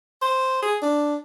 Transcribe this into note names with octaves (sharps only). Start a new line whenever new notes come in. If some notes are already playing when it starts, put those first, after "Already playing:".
C5
G#4
D4